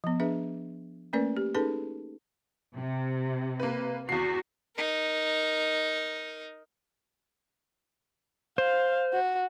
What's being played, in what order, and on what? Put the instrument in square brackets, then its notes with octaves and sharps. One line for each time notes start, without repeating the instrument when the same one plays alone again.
[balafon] F3 B3
D4 G#4 B4 E5
A3 A#3 C#4 A#4 B4 D5
G4
C#4 D#4 G#4 A4 B4 A5
[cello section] C3
[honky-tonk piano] A#3 B4
[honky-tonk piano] E2 C7 [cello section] F#4
[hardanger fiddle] D#4 A#4
[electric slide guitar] C5 [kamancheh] F5
[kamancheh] F#4